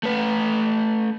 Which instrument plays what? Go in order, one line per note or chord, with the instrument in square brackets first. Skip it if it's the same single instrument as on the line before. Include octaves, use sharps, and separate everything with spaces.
[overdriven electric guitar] A3 B4